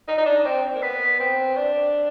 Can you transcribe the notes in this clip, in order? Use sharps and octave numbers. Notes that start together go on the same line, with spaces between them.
D#4
D#4
D4
C4
A#3
B3
C4
D4